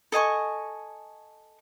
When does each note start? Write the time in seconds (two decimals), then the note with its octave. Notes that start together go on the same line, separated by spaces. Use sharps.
0.12 A4 D#5 G#5 C#6